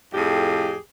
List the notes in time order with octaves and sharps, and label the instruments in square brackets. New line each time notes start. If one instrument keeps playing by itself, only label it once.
[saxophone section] F2 A2 G4 G#4